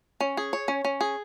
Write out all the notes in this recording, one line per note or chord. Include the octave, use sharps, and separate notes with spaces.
C#4
G#4
C#5
C#4
C#4
G#4